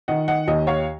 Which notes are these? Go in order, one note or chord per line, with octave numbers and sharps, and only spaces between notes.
D#3 D#5 F#5
D#5 F#5
D#2 D#5
C#5 F5